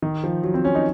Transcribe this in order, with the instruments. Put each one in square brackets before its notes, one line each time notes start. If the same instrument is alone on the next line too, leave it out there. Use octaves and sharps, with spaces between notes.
[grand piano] D#3
F3
F#3
C4
C#4
D#4